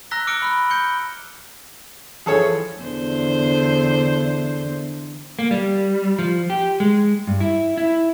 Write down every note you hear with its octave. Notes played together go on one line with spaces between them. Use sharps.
A#5 E6 F#6 A#6 B6 G7
D6 E6 F6 C#7 D7
B5 F6
G6 C#7 G7
E3 F3 G#4 A4 C#5
E2 D3 C5
A#3
G3
F3
G4
G#3
G2
E4
E4